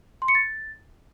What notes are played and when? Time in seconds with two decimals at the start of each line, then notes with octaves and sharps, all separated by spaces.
0.22 C6
0.28 C#7
0.35 A6